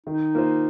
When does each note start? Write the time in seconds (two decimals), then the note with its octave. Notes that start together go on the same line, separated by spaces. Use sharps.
0.07 D#3 D#4
0.35 A#3 F4 C5